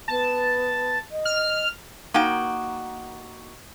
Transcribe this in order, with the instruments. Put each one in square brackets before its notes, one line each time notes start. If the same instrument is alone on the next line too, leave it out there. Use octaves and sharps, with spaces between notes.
[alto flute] B3 [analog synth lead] A5
[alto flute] D#5
[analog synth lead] F6
[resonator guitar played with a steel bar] A#3 D#4 F#4 G5